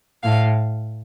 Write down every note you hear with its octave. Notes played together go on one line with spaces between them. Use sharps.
A2 F5